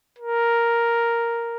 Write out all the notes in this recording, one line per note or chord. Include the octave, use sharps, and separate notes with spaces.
A#4